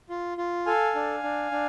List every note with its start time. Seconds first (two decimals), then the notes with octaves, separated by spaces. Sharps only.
0.09 F4
0.37 F4
0.66 A4 F5 G#5
0.95 D4
1.23 D4
1.51 D4